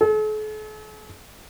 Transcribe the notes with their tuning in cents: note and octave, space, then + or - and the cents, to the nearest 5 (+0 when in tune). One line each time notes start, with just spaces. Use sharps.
A4 -45